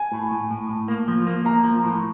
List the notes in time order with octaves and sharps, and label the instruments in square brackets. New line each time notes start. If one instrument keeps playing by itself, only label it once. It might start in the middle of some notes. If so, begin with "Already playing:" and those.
Already playing: [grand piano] G#5
[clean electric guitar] A2
A2
A2
A2
A#3
F3
A#3
[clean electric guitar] A#3 [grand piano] A#5
[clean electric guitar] F3
A2